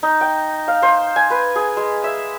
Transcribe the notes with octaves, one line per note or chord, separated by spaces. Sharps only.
D#4
G5
F5
C5
G#5
B4
G#4
G#3
E5